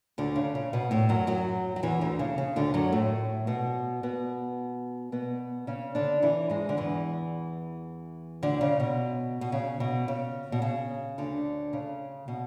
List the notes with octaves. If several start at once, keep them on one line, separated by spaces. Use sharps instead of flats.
D2 D3
C#3
C#3
B2 B3
A2 A3
F#2 F#3
F#2 F#3
F#3
E2 E3
D2 D3
C#3
C#3
D2 D3
F#2 F#3
A2 A3
B2 B3
B2 B3
B2 B3
C#3 C#4
D3 D4
E3 E4
G#2 G#3
D3
E2 E3
D2 D3
C#3
B2
B2
C#3
B2
C#3
B2
C#3
D2 D3
C#3
B2